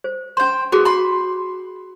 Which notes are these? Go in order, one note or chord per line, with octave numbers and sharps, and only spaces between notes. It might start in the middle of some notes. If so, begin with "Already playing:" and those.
C5
C#4 C5 G5 C6
B3 F#4 G#4
B5 C6